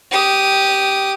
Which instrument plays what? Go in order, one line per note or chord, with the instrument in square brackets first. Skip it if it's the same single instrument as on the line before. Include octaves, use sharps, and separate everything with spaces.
[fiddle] G4 D#6